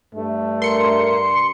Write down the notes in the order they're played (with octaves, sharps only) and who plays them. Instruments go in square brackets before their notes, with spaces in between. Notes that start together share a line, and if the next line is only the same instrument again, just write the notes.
[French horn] G2 [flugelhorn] A3
[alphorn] A#4 [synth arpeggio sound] C6 C#7